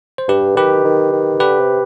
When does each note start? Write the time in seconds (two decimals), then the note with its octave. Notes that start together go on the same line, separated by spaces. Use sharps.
0.18 C5
0.28 G2 G4 B4
0.57 D#3 G4 B4
0.85 D#3
1.13 D#3
1.40 D3 G4 B4
1.59 C3